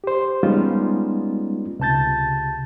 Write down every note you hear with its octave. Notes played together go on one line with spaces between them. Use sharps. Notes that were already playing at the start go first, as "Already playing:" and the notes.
G4 C5
G3 G#3 B3 C#4 D#4 F4
C#2 C3 A5 G6 A6